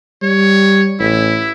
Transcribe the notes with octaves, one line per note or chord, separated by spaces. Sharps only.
G3 C#5
A1 E4